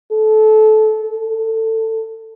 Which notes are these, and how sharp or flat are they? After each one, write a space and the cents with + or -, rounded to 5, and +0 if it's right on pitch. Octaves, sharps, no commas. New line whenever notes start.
A4 -20
A4 +20